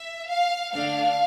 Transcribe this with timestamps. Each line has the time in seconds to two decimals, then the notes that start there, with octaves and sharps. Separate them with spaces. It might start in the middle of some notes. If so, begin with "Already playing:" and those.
Already playing: E5
0.28 F5
0.73 D3 A3 D4 F5